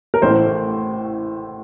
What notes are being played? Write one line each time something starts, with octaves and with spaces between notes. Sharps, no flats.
A#4
A1 A2 A3 C5